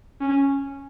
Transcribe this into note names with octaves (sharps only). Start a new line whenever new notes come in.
C#4